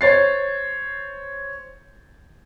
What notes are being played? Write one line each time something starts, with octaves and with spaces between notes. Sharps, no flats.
C5 C#5 A6 C7